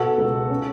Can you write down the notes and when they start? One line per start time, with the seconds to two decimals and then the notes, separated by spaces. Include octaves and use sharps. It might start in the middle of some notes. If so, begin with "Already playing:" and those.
Already playing: B2 F#4 A4
0.18 C#2
0.50 C#4